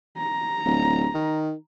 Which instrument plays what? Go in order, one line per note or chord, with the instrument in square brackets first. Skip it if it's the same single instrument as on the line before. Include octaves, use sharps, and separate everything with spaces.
[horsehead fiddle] A#5
[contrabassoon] D1
D#3